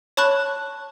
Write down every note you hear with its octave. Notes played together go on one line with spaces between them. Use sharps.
C#5 A5 B5 C#6 F#6